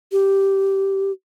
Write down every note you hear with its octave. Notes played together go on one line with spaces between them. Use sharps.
G4